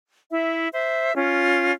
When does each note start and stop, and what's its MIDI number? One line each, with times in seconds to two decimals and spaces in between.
0.31 0.68 64
0.31 0.68 76
0.73 1.14 72
0.73 1.14 76
1.16 1.72 61
1.16 1.72 65